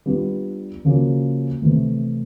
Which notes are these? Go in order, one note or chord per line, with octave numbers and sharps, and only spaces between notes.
G3 B3 D4 F4
C#3 F3 A#3 C#4 F#4
C3 E3 A3